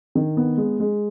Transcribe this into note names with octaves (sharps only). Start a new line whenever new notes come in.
D#3
B3
G#3
G#3